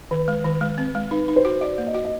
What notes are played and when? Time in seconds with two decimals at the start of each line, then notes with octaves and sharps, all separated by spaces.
0.11 D#3 B4
0.28 G#3
0.44 D#3
0.61 G#3
0.78 C4
0.95 G#3
1.11 D#4 B4
1.28 D#4
1.36 C5
1.45 F#4
1.61 F#4 D5
1.78 A#3
1.87 D#5
1.94 F#4
2.05 D#5